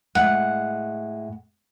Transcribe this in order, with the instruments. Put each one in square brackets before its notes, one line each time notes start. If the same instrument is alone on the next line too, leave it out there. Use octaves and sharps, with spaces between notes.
[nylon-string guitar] A2 G#3 [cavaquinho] F#5